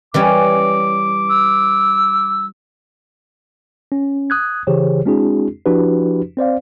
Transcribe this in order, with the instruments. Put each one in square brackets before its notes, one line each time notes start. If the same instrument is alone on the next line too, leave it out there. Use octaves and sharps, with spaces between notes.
[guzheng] E3 G3 C#4 [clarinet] D6
[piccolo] E6
[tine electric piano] C#4
D#6 F#6 G#6
C#3 E3 G4 G#4 C5 C#5
G#3 C4 D4 E4 F#4 G#4
F3 D4 E4 F#4 G4 B4
C4 C5 D5 F5